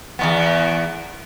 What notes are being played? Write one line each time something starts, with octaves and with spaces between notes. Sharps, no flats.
E2 A#2 B3